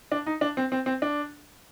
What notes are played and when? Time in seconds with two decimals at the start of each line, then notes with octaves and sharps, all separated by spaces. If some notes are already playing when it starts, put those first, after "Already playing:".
0.12 D4
0.26 D#4
0.41 D4
0.57 C4
0.72 C4
0.86 C4
1.02 D4